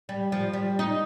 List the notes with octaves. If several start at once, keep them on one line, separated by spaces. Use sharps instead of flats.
G3
F3
G3
D#4